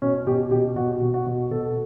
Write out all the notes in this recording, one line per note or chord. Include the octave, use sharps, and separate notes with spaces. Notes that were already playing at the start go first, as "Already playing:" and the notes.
B2 C#4
B2 G4
B2 G4
B2 F#4
B2
F#4
B2
B2 A4